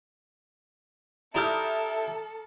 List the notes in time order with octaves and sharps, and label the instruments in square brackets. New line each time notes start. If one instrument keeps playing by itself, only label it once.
[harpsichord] D4 E4 G4 [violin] A4 [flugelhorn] E5 [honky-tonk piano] A#5 D#6 F6